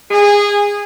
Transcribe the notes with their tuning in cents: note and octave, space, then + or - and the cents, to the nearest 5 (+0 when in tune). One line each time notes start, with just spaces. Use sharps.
G#4 -20